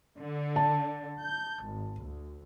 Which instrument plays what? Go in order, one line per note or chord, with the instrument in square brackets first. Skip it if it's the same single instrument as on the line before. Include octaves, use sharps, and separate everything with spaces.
[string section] D3
[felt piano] A5
[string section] G6
G#1
D2